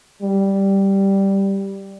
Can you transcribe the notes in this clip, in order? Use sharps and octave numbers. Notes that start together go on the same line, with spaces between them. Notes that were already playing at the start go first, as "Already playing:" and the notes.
G3